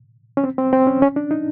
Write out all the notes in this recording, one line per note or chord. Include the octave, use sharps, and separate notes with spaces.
C#4
C4
C4
C4
C#4
C#4
D4
D#4